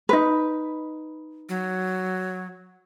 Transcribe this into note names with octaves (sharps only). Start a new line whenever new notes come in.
D#4 B4
F#3